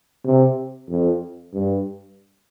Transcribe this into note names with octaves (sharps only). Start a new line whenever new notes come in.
C3
F2
G2